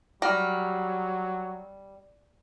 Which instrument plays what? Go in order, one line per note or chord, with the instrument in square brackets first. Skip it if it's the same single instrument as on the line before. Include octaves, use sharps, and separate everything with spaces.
[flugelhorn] F#3 [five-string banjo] G3 [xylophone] F6 A#6